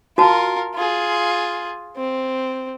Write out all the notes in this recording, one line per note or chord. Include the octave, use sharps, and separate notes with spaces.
F4 F#4 A#4 A5
F4 G#4
C4